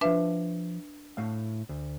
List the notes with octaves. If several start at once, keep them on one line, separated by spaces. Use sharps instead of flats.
F3 D4 B4 E5 F5 A5
A2 A3 F5
D2